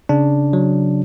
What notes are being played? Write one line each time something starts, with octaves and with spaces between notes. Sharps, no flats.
C#3 D4
F#3